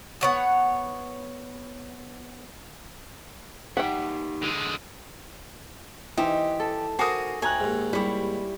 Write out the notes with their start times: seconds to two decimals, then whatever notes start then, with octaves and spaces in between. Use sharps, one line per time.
0.21 B3 C#5 F#5
3.77 D#4 G4 E5 F#5 G5
4.42 D3 G#3
6.17 E3 D#4 G4 C5 E5
6.60 A4
6.99 F#4 A#4 C5 G#5 D6 D#6 C7
7.42 D2 C#5 G5 G#5 A#5 F#6
7.60 D#2 G#2
7.93 G3 E4 G4 C#5